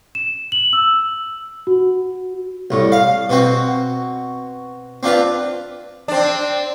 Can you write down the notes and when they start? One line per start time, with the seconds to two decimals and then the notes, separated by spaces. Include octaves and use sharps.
0.15 E7
0.52 F#7
0.73 E6
1.67 F#4
2.71 C2 A2
2.92 F5
3.30 B2 C4 F#4
5.03 C4 D4 F4 B4
6.08 C4 D4